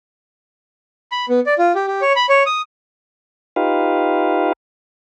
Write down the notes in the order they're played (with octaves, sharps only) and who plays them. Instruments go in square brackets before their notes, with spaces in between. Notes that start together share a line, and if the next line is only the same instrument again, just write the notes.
[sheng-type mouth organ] B5
B3
D5
F4
G4
G4
C#5
B5
C#5
D#6
[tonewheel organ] D#4 F4 G4 B4 F5